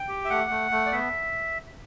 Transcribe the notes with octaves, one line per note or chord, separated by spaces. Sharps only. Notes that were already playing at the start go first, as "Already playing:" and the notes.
Already playing: G5
G4
E5
A3 F#5
A3
A3
D5
B3 E5